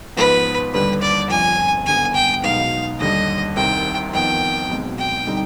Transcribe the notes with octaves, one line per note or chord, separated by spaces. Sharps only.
G#2 F3 B3 B4
D#2 D3 G3 B4
D5
G1 F2 D3 F3 G#5
G#1 G2 D3 G3 B3 G#5
G5
B1 B2 G#3 B3 D#4 F5
D#2 D3 G3 D#5
C2 C3 D#3 G5
F2 D#3 B3 G5
B1 B2 G#3 C4
G5
D3 G3 C4 D#4